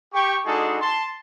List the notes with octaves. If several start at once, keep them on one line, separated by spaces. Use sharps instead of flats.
G4 G5 C#6
G#3 D4 D#4 F#4 G#4 A4
A5 C6